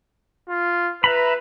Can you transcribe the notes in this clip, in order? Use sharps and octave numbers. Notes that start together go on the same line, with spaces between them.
F4
B4 E5 A#5 B5